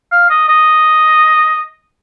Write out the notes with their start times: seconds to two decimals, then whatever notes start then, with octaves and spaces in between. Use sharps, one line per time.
0.12 F5
0.30 D#5
0.49 D#5